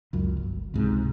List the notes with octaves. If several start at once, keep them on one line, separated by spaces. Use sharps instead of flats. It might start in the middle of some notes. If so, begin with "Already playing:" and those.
C#2 F#2
G1
C#2 G#2 C3